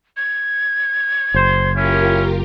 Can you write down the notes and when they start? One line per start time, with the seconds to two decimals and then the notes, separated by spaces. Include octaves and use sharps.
0.17 G#6
1.34 F#1 C5
1.75 C#4 E4 F4 G4 A#4